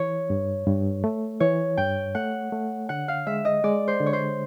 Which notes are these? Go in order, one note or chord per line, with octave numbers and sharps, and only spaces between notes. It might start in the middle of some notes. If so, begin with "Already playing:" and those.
Already playing: E3 C#5
G2
G2
A3
E3 C#5
G2 G5
A3 F#5
A3
D3 F#5
F5
G#3 E5
D#5
G#3 D5
C5
D3
C#5
C5